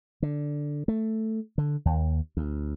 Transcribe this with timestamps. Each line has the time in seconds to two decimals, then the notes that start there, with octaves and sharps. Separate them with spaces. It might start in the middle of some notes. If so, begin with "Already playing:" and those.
0.22 D3
0.88 A3
1.58 D3
1.85 D#2
2.37 D2